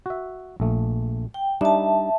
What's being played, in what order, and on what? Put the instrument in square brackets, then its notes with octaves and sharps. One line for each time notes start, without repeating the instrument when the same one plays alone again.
[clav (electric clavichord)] F#4 E5
A#1 A3
[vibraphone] G5
[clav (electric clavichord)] G3 D4 D#4 [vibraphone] E5 A5